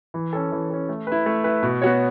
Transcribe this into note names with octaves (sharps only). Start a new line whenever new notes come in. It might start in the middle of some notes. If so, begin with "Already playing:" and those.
E3
C#4 A4
E3
C#4 A4
A3
E4 B4
A3
E4 B4
B2
B3 F#4 C#5